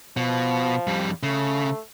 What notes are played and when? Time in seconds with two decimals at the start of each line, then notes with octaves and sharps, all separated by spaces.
0.17 B2 F3
0.87 F2 G3
1.23 C#3 A3